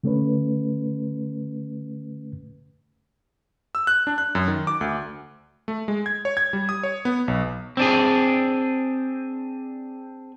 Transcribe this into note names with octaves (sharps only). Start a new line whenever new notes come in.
D3 A3 C#4 B4
E6
F#6
D4
F#6
F#2
D#3
D6
D2
A3
G#3
G#6
C#5
G#6
G3
D#6
C#5
B3
B1
C4 D4 G#4